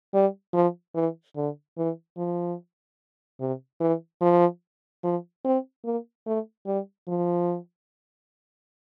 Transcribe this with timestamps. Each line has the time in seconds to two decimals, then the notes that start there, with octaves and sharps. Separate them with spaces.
0.14 G3
0.54 F3
0.95 E3
1.36 D3
1.77 E3
2.17 F3
3.40 C3
3.80 E3
4.21 F3
5.03 F3
5.45 C4
5.84 A#3
6.26 A3
6.66 G3
7.08 F3